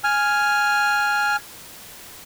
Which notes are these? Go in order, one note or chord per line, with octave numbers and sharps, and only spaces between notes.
G#5 F6